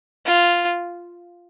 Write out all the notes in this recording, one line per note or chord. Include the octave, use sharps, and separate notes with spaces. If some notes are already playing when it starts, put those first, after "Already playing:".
F4